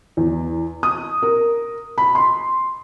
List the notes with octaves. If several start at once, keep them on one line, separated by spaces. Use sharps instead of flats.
E2
D#6
A#4
B5
C6